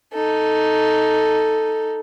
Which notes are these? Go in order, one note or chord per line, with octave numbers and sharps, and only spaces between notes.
D#4 A4